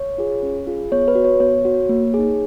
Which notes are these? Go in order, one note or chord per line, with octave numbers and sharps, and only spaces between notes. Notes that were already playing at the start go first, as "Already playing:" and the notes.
Already playing: C#5
F4 G#4
C#4
F4 G#4
B3 C#5
B4
F#4
C#5
B3 C#5
F#4
A#3
D#4 G#4